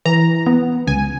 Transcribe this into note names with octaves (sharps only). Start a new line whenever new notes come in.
E3 A#5
B3
C#2 G#5